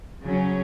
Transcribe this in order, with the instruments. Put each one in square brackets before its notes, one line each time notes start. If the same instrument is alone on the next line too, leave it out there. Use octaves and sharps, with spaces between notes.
[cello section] C#3 F#3 C#4